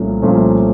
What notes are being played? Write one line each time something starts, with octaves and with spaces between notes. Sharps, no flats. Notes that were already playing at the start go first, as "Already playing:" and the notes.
Already playing: C2 A#2 F3 A3 C#4
C2 A#2 F3 A3 C#4